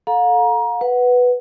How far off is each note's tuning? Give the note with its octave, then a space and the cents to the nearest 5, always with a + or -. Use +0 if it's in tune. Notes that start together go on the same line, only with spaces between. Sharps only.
A4 +0 F5 +40 A#5 +25
B4 +0 F#5 +0